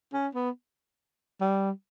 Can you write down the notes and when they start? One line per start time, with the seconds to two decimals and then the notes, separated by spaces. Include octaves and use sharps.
0.13 C#4
0.35 B3
1.41 G3